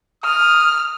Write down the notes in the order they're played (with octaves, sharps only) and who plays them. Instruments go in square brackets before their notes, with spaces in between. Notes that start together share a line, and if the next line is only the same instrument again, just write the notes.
[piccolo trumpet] D#6 [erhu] F6